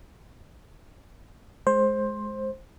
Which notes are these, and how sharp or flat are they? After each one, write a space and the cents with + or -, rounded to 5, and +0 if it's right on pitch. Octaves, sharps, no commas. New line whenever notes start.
G#3 +15 C5 +15